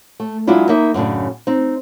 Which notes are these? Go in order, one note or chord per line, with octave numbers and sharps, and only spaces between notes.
A3
F#3 G#3 D4 E4 F4
A#3 D#4 E5
F#2 A2 C#3 D4
C4 D#4